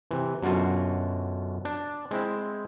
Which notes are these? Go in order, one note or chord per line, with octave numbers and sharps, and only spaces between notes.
C3 E3
F#2 B2 D3 F4 F#4
D4
G#3 C4 E4